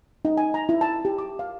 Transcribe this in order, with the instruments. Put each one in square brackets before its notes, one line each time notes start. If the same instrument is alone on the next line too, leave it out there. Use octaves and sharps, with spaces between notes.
[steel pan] D#4
G#5
A#5
E4
A5
G4
D6
F5